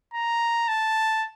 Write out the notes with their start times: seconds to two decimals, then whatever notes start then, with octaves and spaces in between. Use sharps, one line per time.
0.14 A#5
0.69 A5